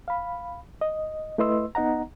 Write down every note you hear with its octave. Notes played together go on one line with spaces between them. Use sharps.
F5 B5
D#5
A3 E4 B4 D#5 C6 E6
B3 D#4 D#5 F#5 A#5